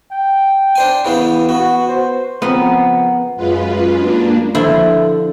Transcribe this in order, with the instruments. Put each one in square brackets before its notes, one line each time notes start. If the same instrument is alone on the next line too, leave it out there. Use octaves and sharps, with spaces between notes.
[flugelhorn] G5
[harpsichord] D4 C5 G#5
C#3 E3 B3
[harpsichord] B3 [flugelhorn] F#4
[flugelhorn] C5
[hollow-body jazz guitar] C#3 F3 C4 [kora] B3 [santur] A#4 F#5
[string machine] F#2 G#3 F4 B4
A#3 D4
[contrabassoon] D3 [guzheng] F3 E4